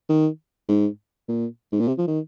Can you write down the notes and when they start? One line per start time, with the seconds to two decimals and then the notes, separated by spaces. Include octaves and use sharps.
0.09 D#3
0.69 G#2
1.28 A#2
1.72 G#2
1.80 A#2
1.88 C3
1.98 F3
2.07 D#3